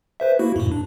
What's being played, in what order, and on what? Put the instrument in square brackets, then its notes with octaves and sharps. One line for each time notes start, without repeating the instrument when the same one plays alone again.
[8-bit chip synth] B4 C5 E5
A#3 E4 F#4
F#2 A#2
D4